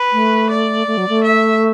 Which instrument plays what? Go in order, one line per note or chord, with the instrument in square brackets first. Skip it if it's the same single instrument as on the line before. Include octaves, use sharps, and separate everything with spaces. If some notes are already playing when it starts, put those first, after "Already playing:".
Already playing: [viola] B4
[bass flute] A3
[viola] D5
[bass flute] A3
F#3
A3
[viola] E5